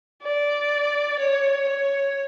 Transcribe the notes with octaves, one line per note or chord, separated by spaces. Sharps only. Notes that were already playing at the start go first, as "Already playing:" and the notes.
D5
C#5
C#5